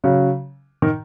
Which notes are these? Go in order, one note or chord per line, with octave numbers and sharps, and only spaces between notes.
C#3 F#3
D#3